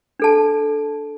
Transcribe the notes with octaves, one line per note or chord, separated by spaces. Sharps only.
D4 A4 A5